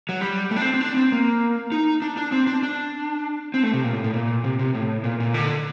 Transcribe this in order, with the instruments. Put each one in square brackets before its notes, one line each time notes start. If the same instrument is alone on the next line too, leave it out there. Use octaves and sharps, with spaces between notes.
[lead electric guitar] F#3
G3
A3
D4
C4
C4
D4
C4
A#3
D#4
D4
D4
C4
D4
D4
C4
A3
C3
A#2
A2
A2
A#2
C3
C3
A2
A#2
A#2
D3